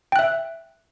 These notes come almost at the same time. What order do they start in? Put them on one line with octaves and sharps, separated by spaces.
G5 F#6 E5